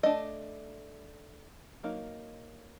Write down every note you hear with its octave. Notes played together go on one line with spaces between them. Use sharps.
A3 D4 D#5
F#3 A#3 D#4